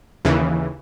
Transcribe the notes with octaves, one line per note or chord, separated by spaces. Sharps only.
D#2 C#3 E3